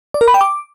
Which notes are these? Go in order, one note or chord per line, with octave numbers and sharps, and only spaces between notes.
D5
A#4
B5
G5
D6